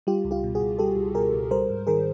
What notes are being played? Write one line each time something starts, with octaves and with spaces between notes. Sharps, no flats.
G3 F4 G4
C#2
F4 G4
B2
F#4 G#4
C#2
G3 G4 A4
C#2
B2 G#4 A#4
C#2
G3 A#4 C5
G#2
D#3 G#4 A#4